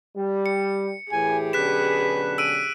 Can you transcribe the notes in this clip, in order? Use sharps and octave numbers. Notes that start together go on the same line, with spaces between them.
G3
C#7
A2 E3 G4 G#4 G#5
B1 D3 C#4 B4 F#6 B6 E7
E6 D7 D#7